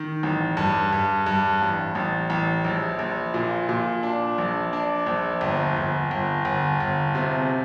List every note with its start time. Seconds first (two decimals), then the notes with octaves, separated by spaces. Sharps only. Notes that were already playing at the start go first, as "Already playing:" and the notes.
Already playing: D#3
0.23 A1
0.57 G2
0.92 G2
1.26 G2
1.62 A1
1.95 A1
2.30 A1
2.64 A#1
2.99 A#1
3.34 A#2
3.69 A#2
4.03 D4
4.38 A#1
4.73 D4
5.06 A#1
5.41 G1
5.76 G1
6.11 G1
6.45 G1
6.80 G1
7.15 C3